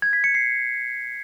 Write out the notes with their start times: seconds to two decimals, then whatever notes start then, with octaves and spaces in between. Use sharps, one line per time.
0.02 G#6
0.13 B6
0.24 C#7
0.35 C7